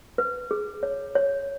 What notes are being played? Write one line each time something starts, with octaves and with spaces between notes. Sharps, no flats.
B4
G#4
C#5
C#5